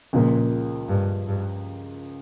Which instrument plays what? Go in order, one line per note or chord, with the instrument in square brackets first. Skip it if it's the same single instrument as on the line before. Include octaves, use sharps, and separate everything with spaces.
[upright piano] C#2 C#3 F3 A#3 [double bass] A#2
[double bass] G2
G2